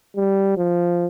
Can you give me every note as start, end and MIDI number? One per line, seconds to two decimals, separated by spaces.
0.17 0.55 55
0.57 1.06 53